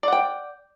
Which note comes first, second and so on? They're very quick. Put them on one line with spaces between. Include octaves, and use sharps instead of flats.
D5 F#5 G5